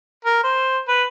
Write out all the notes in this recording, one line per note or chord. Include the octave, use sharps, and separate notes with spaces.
A#4
C5
B4